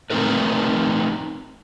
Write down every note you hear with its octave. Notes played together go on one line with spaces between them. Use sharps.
A3 C4 D#4 A#4 B4